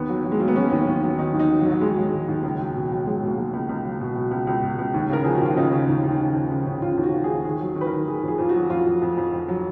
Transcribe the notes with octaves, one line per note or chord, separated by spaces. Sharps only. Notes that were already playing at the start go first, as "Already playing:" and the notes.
Already playing: D#2 B3
F#3
F#3
G#3
F#3 A#3
B3
F#3 C#4
D#2
D#2
F#3
D#3 D#4
D#2
D#4
F#3
F#3
D#2
F#3
D#2 G#3
F#3
D#2
D#2
C#2
F#3
B2
F#3
F#3 G#3
B2 A#3
F#3
C#2
C#2
F#3
B2
B2
C#2
C#2
B2
C#2
D#2
C#3 A#4
F3 G#4
F#4
D#2 F4
C#3 D#4
C#3
D#2
D#2
C#3
F3
C#3
C#3
C#3 F4
D#2
F#4
F3
D#2 G#4
D#3 G#4
F#3
D#3
B4
A#4
D#3
D#3 G#4
F2 G#4
F2 F4
F#4
F#3
F2 F4
F2
F2
F2
F2
F#3